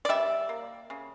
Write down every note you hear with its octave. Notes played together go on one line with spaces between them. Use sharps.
D5
G3 E5
A#3
C#3